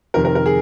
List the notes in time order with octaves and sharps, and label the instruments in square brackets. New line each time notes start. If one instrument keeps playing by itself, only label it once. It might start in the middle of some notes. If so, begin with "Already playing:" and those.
[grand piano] F2 C3 D#3 A#4
A#4
A#4
G#4